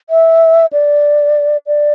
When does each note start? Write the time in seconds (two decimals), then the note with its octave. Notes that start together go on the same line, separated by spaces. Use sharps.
0.10 E5
0.73 D5
1.67 D5